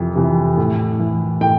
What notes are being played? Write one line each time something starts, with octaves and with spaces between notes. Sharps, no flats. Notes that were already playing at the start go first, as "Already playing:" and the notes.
Already playing: F2 C3 E3
C3 E3
A2
E3
A2 G5